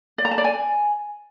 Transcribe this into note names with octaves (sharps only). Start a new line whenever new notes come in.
D5
A#5
A5
D5
G#5